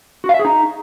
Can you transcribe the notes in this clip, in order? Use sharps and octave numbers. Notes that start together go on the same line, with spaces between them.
F#4
F5
E5
G#4
D#4